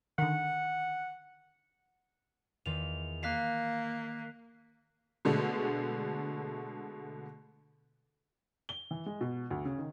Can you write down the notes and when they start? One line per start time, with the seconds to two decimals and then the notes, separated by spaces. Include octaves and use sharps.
0.18 D3 D#3 F#5
2.66 E2 D#3 F4 F7
3.23 A#3 F5 F#6 B6 C7
5.25 B2 D3 G#3 A3
8.69 G7
8.91 E3
9.06 G#3
9.21 B2
9.51 D2
9.65 C#3
9.78 D#3